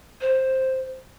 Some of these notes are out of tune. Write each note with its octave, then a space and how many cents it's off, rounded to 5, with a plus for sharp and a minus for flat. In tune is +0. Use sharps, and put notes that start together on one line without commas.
C5 +5